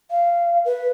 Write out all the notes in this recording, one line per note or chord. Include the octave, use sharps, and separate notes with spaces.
F5
B4